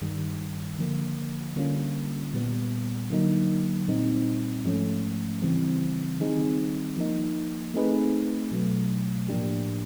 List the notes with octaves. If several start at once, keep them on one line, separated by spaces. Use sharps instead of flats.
G2 D#3 G3
D3 F3 A#3
D3 G3 A#3 C#4 F4
A#2 G3 B3
D3 F#3 A#3 D#4
A#2 G3 C4 D#4
G#2 F3 A3 C#4
C#3 E3 G3 C4
D#3 G3 C4 D#4 G#4
F3 A#3 D#4
A3 C4 D#4 G#4 B4
B2 F#3 A3
A2 F3 A#3 D4 G4